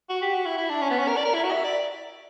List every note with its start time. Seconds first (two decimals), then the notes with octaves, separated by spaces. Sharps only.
0.10 F#4
0.22 G4
0.34 F#4
0.46 E4
0.58 E4
0.69 D4
0.81 C#4
0.90 B3
0.99 C#4
1.08 A#4
1.17 D5
1.25 A#4
1.34 E4
1.44 F#4
1.52 E5
1.65 D5